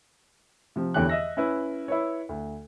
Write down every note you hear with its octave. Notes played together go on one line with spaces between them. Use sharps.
C3 F3
E2 D3 E3 G4 C#5 F#6
D#5 E5 E6 A#6
C#4 E4 B4
E4 B4 C#5
D2